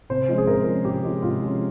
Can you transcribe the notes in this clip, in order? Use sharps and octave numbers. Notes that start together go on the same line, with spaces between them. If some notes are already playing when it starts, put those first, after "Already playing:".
C3 C5
F3 G#3 C#4
G#4
C3 A#4
F3 G#3 C#4
C3 G4
F3 G#3 C#4
C3 F4
F3 G#3 C#4